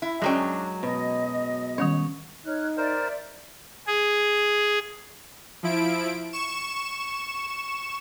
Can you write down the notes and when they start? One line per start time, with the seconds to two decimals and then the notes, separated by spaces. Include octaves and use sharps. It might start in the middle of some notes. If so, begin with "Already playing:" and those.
0.02 E4
0.22 F#2 F#3 G#3 C#4 D4 G5
0.83 B2 D#5
1.78 D#3 G3 C#4 C#5
2.46 D#4 C#5 F6 F#6
2.77 A#4 C5 D5 E5
3.87 G#4
5.63 F3 E4 D7
6.33 C#6 E7